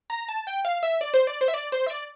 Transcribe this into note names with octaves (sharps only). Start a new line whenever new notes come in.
A#5
A5
G5
F5
E5
D5
C5
D5
C5
E5
D5
C5
E5
D5